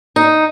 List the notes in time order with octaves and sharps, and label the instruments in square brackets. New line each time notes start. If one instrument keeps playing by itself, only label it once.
[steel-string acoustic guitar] D#4